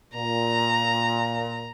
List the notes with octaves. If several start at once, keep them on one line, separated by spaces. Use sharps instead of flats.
A#2 A#5